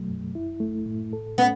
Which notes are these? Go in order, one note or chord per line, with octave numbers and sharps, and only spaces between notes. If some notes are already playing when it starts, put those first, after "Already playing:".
Already playing: B2 F#3 A3
F#2
E4
A3
A2
A4
B3 C#4